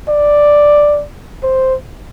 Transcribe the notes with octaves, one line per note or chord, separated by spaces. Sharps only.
D5
C5